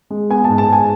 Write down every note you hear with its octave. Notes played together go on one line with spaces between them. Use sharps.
G#3
B3 G#5
A5
G#2
A5
G#2 G#5